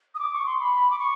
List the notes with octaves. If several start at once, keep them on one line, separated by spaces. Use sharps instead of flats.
D#6
D6
C#6
C6
B5
D6
C#6